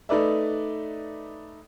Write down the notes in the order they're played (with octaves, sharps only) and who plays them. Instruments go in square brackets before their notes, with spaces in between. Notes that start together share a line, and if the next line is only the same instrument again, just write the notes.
[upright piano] A3 D#4 B4 D5 E5